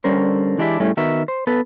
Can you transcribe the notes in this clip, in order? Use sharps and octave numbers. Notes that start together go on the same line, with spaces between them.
D3 G3 C#4 A#4 C5
E3 G#3 D4 E4 G4 E5
A2 G3 A3 C#4 E4
D#3 B3 F#4 A#4 E5
C5
B3 A4 B4